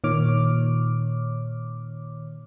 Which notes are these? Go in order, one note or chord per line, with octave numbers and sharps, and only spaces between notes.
A#2 D#3 C#5 D6 F6